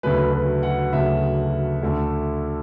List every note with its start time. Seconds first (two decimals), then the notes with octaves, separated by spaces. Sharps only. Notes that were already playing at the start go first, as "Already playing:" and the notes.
0.03 D2 C#3 F#3 A3 B4
0.33 B4
0.63 F#5
0.93 D2 C#3 F#3 A3 E5
1.82 D2 D3 A3